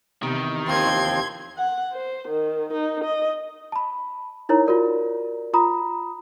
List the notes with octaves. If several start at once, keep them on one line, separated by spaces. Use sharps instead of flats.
E2 C3 D#3
D#2 F3 C4 C6 G#6
F#5
C5
D#3
D#4
D#5
A5 B5
D#4 E4 A#4 C#5 A#5
F4 F#4 A#4 D5
F4 A#5 B5 D#6